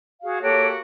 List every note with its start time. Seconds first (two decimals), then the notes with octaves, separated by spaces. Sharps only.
0.22 F#4 G#4 F5
0.42 A#3 F#4 G4 A4 C#5